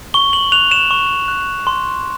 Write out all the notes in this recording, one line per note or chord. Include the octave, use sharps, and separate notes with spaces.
C#6 G7
F#7
F#6 F7
E7
C#6
F#6
C6